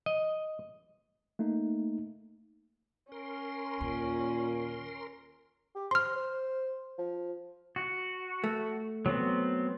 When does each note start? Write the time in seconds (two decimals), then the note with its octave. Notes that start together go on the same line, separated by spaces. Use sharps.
0.06 D#5
1.39 A3 A#3 D#4
3.12 C#4 A#4 C6
3.81 D#2 A#2
5.75 G4
5.91 C5 C6 F6
6.16 C5
6.98 F3
7.76 F#4
8.44 A3
9.06 F#3 B3 C4